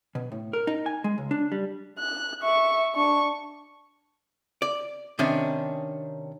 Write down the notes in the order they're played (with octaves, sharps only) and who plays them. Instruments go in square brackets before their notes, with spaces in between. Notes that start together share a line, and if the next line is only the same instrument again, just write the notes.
[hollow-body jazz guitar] B2
A2
A#4
D#4
G#5
G#3
C#2
D4
G3
[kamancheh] F#6
E5 C#6
D4 C#6
[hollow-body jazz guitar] D5
C3 D#3 C#4 D4